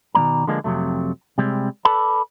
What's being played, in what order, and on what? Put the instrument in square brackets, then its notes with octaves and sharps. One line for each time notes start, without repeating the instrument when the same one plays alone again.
[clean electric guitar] B2 D#3 A#3 D5 A#5
D3 F3 G#3 A#3 D4
F2 C3 F#3 A3
C3 G3 G#3 C4
A4 B4 D5 A5 B5